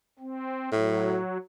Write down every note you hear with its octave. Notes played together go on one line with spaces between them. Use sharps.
C4
A2 F#3